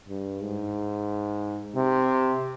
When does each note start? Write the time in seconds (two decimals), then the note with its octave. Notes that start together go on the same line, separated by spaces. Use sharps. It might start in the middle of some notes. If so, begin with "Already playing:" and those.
0.09 G2
0.42 G#2
1.75 C3